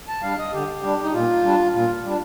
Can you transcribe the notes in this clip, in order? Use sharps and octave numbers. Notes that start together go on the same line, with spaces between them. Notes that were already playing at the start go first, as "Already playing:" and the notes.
A5
G3 D4 F5
D#5
D3 G4
G3 D4
D#4
A#2 F4
G3 D4
A#2 F4
G3 D4